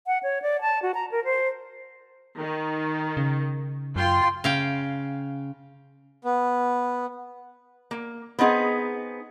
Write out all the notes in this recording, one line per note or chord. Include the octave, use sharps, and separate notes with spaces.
F#5
C#5
D5
A5
F#4
A#5
A#4
C5
D#3
C#3
F#2 F4 G5 C6
C#3 F5 G5
B3
A#3
B3 C4 D#4 G#4